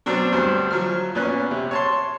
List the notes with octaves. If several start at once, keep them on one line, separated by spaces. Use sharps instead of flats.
B2 F#3 C4 D4
D2 G2 C5
F3 F#3 F6
A#2 B3 C#4 F#6
C3
C#5 A5 C6